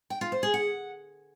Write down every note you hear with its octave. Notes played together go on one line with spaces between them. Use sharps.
G5
F4
C5
G#4
F#5